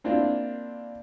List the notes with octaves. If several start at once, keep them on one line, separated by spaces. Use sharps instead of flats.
A#3 C4 D4 E4 F4